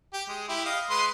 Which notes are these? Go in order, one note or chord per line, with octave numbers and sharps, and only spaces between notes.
G4
G#3
E4 G4
D#5 F5
G#3 B4 C6